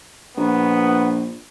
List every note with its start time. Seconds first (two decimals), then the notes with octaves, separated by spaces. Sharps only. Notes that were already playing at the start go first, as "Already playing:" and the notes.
0.37 A#1 B3